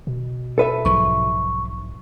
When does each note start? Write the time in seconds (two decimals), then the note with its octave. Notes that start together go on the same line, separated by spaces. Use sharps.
0.07 B2
0.58 A4 B4 E5
0.85 B1 G#2 F3 C#6